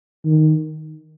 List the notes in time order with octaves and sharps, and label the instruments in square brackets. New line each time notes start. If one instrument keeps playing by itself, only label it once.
[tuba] D#3